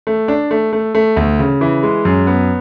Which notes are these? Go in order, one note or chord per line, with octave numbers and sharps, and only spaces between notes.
A3
D4
A3
A3
A3
D2
C#3
E3
G#3
F#2
B3